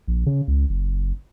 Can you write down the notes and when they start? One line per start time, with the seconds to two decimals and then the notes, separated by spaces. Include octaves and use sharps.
0.08 A#1
0.26 C#3
0.48 C#2
0.69 F#1